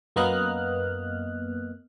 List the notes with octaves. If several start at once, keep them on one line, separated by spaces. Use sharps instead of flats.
F#2 A#3 B3 D#5 F6 F#6